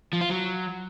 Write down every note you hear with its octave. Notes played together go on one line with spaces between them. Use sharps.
F3
F4
F#3